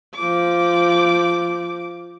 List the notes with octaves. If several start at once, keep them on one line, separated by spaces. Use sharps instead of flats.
F3 D6